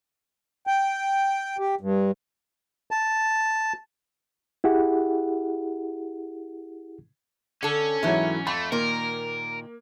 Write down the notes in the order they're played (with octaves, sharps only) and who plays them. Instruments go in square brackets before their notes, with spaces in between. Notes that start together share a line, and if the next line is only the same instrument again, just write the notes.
[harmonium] G5
G4
G2
[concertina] A5
[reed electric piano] E4 G4 G#4 F#5
[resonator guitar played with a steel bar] D3 A4 [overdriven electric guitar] C#4
[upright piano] G#2 E3 F#3 [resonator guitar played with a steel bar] A3 E4
[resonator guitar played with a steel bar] F2 [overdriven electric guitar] A3 [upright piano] B5
[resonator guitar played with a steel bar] A#2 D#3 [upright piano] A#3 [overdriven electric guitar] A#4